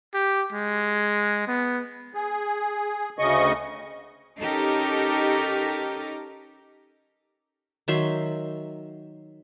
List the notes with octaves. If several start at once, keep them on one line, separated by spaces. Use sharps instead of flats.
G4
G#3
B3
G#4
D2 C#3 D#5 C#6
C#4 D#4 G4 A4 A#4
D#3 F#3 E5 C6